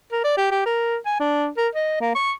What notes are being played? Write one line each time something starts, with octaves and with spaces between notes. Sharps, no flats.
A#4
D5
G4
G4
A#4
G#5
D4
A#4
D#5
A#3
C#6